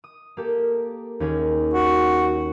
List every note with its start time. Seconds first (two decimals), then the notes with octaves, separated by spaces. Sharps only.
0.04 D#6
0.37 A#3 G4 A4
1.20 D#2 C#4 G#4
1.74 F#4